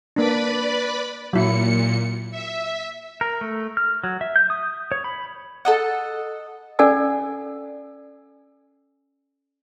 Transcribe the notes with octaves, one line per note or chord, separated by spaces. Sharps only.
A#3 D4 B4 D5 B5
A#2 F#3 E4 C#7
E5
A#4
A3
F6
F#3
E5
G6
D#6
C#5
B5
A4 D#5 F#5
C#4 A4 D5 F#5 G#5 E6